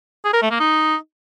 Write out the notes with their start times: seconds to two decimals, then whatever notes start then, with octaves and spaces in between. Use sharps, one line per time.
0.25 G#4
0.33 A#4
0.42 A3
0.51 A#3
0.60 D#4